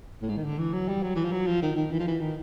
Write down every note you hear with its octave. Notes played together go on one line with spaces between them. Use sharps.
A2
G#2
D#3
D3
E3
F#3
G3
F#3
E3
F3
F#3
F3
D#3
D#3
E3
F3
E3
D#3